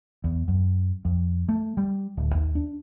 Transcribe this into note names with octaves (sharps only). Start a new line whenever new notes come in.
E2
F#2
F2
A3
G3
D1
D#2
D4